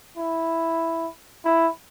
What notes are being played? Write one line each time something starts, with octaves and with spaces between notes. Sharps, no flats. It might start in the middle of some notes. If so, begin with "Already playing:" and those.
E4
E4